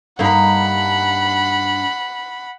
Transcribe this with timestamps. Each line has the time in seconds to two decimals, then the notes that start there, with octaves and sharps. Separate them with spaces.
0.19 G2 A#3 D#4 F#5 B5